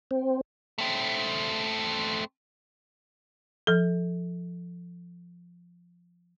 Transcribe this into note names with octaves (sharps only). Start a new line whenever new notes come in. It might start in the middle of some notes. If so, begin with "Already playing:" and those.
C4
A3 C4
F3 A4